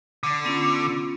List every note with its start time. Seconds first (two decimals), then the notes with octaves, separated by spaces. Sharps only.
0.23 D3
0.45 B3 C#4 F4